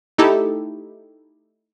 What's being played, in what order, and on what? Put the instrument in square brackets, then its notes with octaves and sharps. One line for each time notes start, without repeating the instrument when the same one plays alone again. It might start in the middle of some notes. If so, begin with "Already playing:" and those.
[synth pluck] A3 D#4 E4 G4 A4